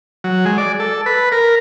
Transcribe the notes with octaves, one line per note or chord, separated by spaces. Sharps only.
F#3
G#3
D5
A4
B4
A#4